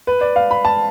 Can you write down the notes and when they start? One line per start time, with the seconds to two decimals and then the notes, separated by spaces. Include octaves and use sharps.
0.07 B4
0.21 D5
0.36 F5
0.51 B5
0.65 A5